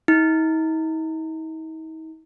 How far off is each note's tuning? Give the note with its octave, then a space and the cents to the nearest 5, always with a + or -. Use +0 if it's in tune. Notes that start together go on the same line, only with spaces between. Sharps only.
D#4 +45